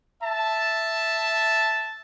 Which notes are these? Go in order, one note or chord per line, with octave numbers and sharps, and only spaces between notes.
E5 A5